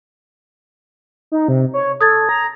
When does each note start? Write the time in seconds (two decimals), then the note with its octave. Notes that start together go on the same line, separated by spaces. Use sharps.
1.32 D#4
1.48 C3
1.74 C#5
2.01 A4 D#6 G#6 A6
2.29 A#5